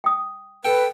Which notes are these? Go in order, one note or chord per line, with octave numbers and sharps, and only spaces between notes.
G5 D#6
A4 B4 G5